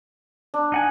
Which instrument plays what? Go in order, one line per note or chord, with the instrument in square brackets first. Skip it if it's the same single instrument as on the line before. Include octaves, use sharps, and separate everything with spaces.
[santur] D4
[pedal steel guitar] D#4 F#5 G#5